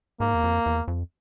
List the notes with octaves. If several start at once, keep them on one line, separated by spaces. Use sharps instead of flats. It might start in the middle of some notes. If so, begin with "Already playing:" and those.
G#2 A#3
E2
F2
E2
F2